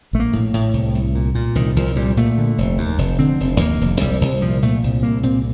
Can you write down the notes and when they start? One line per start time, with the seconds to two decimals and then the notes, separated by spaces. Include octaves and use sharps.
0.13 A#1 A3
0.19 A#3
0.33 A2
0.54 A2
0.73 C2
0.95 C2
1.15 A#2
1.35 A#2
1.55 C2 D#3
1.76 C2 F3
1.96 A#2 G3
2.17 A#2 A3
2.38 D3
2.58 F1
2.78 D#2
2.98 F1
3.19 D3 C4
3.40 F1
3.60 D#2 A#3
3.81 F1
4.01 C2 G3
4.21 C2
4.42 A#2 F3
4.62 A#2 A3
4.83 C2
5.03 C2 A#3
5.23 A#2 C4